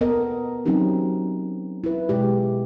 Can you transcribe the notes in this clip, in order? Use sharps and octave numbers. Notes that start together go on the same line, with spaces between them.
B3 A4 A#4 D#5
F#3 C4 C#4 D#4 G4
E4 B4
B2 G#3 G4